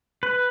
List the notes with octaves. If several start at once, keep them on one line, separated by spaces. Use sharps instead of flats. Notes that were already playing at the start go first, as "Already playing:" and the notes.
B4